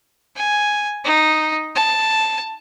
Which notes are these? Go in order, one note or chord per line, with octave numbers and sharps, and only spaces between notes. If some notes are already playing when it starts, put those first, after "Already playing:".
G#5
D#4
A5